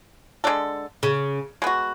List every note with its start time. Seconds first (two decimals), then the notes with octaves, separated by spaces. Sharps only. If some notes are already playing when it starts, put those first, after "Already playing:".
0.44 D3 G#3 D4 A4
1.03 C#3
1.62 G#3 B3 F#4